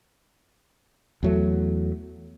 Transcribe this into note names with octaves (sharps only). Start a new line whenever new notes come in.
E2 F#3 A3